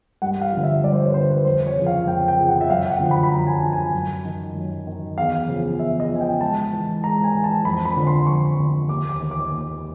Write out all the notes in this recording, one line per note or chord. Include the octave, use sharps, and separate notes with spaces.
G2 F#5
F5
F3
D3
E5
G2 D5
C5
C#5
B4
D3 F3 C5
B4
F2 C5
C#5
C#3
F3
F5
F2 G5
G5
C#3 F3
F#5
E5
F#2 F5
G5
F#5
D3 F3
B5
B5
F#2 A#5
G#5
A5
D3 F3
G#5
F#2
D#3
F#2
D#3
E2 F5
C#3 F3
E2 E5
D#5
F3
C#3 G#5
G5
G#2 A5
E3
G#2 A#5
G#5
E3
A5
F2 B5
B5
D3 F3
C6
F2 C#6
D3 F3
D#2 D6
D6
D#3
D6
D#2